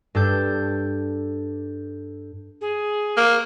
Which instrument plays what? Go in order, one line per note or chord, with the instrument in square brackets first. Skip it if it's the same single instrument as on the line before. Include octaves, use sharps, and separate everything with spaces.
[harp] G2 D4 A4 G6
[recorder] G#4
[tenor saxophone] A#3